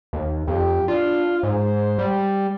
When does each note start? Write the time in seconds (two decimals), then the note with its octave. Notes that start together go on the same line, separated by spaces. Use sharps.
0.13 D#2
0.48 F2 G4
0.88 D4 F4
1.43 G#2 C5
1.98 G3